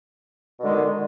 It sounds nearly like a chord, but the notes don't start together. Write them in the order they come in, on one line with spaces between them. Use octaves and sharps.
B2 D3 G#3 D#3